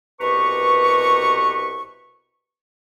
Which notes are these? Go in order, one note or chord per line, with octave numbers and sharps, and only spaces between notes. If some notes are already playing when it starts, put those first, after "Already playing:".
C2 B2 G4 B4 A#5 C#6